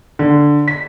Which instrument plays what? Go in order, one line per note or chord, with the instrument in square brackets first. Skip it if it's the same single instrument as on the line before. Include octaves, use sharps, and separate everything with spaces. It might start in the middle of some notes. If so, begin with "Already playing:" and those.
[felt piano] D3
B6